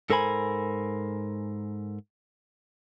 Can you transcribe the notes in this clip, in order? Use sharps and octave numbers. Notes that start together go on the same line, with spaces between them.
G#2 A4 A#4 C5 G#5 B5